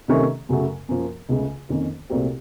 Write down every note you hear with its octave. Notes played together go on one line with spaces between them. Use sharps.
C3 D#3 A3 C#4
F#2 C#3 F#3 A3
F#2 F3 A#3
C#2 C#3 A3
F2 D#3 A#3 C#4
C2 A#2 A3 C4 F#4